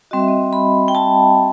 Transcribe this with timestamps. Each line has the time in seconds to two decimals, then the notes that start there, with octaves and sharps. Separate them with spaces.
0.11 G3 C4 F#4 D#5
0.20 E5
0.28 D#5
0.53 B5
0.88 G5
0.95 A5